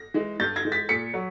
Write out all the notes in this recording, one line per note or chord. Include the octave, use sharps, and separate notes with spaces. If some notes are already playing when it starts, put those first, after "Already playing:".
Already playing: A#6
E3 G#3
G2 G6 A6
G#6 A#6
E3 G#3
A6 B6
A#2 B6 C#7
F#3